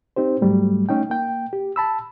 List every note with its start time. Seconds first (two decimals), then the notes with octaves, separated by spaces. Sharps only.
0.16 C4 D#4 G4 C5
0.41 G#2 F#3 G3 A3
0.89 A3 C#4 D#4 G5
1.10 A#3 G5
1.53 G4
1.76 A5 B5 E6